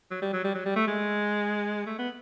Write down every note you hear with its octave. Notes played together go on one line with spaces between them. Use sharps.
F#3
G3
F#3
G3
F#3
G3
A3
G#3
A3
B3